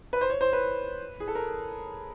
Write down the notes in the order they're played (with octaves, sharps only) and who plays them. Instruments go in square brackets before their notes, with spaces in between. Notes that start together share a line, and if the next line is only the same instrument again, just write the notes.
[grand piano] B4
C5
C#5
C5
B4
G#4
A4
A#4